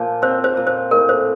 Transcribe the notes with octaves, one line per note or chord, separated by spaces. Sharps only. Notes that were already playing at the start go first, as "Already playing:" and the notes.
Already playing: A#2 F3
C4 C5
C5
A#2
C5
A2 A#4
C5